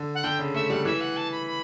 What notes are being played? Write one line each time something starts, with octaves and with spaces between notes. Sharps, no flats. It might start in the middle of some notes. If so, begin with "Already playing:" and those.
Already playing: D3
F#5
D3 G5
C#3
A3 E5
G3 F#5
E3 E5
F#5
A5
B5
B5